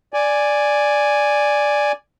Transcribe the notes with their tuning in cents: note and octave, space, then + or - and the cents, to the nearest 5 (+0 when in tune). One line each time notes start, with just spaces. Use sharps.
D5 +0 G#5 +0